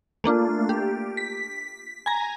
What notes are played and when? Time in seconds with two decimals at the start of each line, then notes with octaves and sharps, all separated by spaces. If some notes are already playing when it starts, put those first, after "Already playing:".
0.24 A3 A#3 D4 F4
0.69 G4
1.17 B6
2.06 G#5 A#5